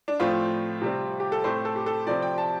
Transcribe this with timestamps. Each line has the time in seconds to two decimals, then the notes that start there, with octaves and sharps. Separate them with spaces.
0.08 D4
0.19 A2 F3 A3 C4 F4
0.82 C3 G3 C4
1.20 G4
1.32 A4
1.44 A2 A3 C4 C5
1.65 A4
1.76 G4
1.86 A4
2.07 C3 F3 C4 D5
2.22 G5
2.38 A5